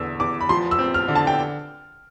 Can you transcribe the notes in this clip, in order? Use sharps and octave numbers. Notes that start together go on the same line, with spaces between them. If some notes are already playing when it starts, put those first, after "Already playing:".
Already playing: E2 D3 E6
E2 D6
B5
F3 C6
E6
C4
F6
D3
A5
G5